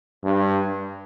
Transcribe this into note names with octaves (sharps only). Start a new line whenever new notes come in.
G2